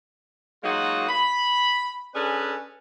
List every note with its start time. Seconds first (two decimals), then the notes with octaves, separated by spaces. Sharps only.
0.64 F#3 G#3 A#3 D#4 F4 F#4
1.08 B5
2.15 C#4 D4 G#4 A4 B4